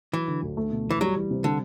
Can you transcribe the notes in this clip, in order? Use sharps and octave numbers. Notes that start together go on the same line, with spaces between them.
E3 F#3
D3
D2
A3
B2
E2 E3
F#3 G3
E3
C3
D3 G3